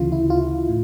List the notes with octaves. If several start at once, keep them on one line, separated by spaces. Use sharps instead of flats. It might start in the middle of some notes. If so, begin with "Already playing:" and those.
Already playing: D2 C#3 E3 F4
E4
F4
A2